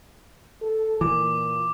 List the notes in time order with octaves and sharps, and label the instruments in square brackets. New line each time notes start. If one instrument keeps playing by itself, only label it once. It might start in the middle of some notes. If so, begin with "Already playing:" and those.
[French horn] A4
[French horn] A#2 [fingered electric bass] E3 [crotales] D6